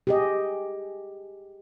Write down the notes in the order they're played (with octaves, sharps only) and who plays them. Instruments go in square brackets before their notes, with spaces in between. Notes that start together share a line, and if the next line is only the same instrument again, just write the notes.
[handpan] G4 G#4 D#5